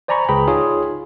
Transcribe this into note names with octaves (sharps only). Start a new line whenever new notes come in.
C5 D5 G#5 A#5 B5 C#6
C#2 G#4 B4 G5 A#5 B5
D#4 F4 G#4 C#5